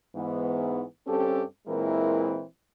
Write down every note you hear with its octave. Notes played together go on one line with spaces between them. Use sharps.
G#2 E3 B3
G2 C4 C#4 G4 A4
A#2 E3 G#3 C4 E4 A#4